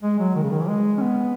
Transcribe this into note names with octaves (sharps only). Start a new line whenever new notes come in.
G#3
F#3
D#3
C#3
D#3
E3
G#3
C#4
B3